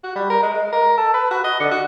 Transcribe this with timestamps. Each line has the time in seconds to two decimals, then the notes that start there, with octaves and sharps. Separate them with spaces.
0.04 F#4
0.16 G3
0.30 A#4
0.43 G#3
0.55 G#3
0.72 A#4
0.98 A4
1.14 B4
1.31 F#4
1.44 D#5
1.60 D3
1.71 F#4